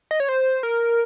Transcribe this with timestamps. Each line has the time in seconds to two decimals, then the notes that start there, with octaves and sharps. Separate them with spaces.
0.11 D#5
0.20 C#5
0.29 C5
0.63 A#4